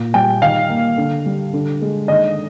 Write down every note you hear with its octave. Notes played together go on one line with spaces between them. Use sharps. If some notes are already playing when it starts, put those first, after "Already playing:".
Already playing: A#2
G3 G5
D#3 F5
A#3
D3
G3
D3
G#3
D#3 D#5